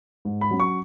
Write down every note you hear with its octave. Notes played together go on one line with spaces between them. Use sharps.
G#2
B5
F#3 C#4
C#6